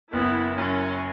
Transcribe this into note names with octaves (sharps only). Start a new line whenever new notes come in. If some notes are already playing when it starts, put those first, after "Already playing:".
F#1 B3 E4
F#2 F#3 C#4